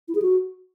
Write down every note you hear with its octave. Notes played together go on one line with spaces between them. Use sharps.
E4
G#4
F#4